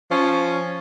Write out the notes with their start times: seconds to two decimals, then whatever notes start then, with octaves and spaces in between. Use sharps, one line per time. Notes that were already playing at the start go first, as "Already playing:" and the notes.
0.10 F3 C#4